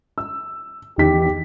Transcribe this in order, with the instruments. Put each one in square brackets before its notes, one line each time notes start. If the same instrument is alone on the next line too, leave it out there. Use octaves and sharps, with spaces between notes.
[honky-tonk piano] E6
[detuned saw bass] E2 [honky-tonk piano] D#3 B6 [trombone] G4